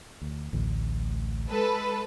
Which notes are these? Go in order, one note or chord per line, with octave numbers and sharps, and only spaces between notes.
D2
A1 D2
G#3 A4 B4